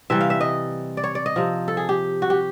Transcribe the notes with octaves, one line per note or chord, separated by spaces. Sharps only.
C3 E3 G3 E5
F5
E5
D#5
D5
C#5
D5
D#5
C3 F3
A4
G#4
G4
F#4
G4